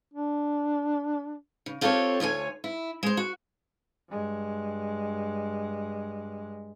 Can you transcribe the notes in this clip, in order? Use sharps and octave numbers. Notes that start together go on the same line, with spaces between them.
D4
C#3
C4 F4 G4 A4 C5 C#5
D2 F4 C#5 G#5
E4
G#3 C5
F#4
G2 G#3